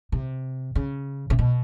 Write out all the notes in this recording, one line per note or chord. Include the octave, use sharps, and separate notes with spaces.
C3
C#3
C3
B2